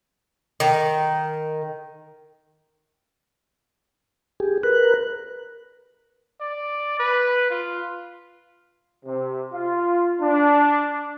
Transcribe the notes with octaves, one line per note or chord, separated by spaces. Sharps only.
D#3
G4 G#4
A#4 B4 F#6
D5
B4
F4
C3
F4
D4